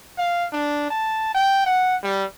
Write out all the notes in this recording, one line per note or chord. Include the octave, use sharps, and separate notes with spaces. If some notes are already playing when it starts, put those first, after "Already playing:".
F5
D4
A5
G5
F#5
G3